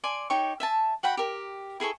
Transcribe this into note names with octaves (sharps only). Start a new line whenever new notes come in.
D5 G#5 C6
D#4 G4 C#5 C#6
E5 G#5 A5
F#4 F#5 G5 B5
G4 A#4
E4 G#4 A4 C#6